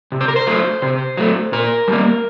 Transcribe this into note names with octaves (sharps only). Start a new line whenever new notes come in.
C3
C5
A#4
C5
F#3 A3
C3
F#3 A3
A#2 A#4
G3 A#3